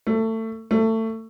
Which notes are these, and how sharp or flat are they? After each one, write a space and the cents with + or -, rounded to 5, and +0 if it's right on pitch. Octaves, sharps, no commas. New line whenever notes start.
A3 +25
A3 +25